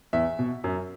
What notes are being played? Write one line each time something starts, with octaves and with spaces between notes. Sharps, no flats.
E2 E5
B2
F#2